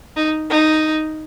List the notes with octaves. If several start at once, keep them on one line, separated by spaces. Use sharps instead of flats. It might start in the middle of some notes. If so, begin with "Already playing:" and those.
D#4
D#4